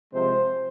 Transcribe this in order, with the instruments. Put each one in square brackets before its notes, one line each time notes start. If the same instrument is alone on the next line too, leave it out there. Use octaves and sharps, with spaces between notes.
[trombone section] C3 F3 G#3 C4 C5